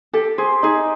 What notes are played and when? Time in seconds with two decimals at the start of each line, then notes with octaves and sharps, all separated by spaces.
0.13 G4 A4
0.38 G#4 C5
0.63 D#4 G#4